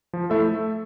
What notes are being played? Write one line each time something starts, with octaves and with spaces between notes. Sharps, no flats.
F3
A3 E4 A4 E5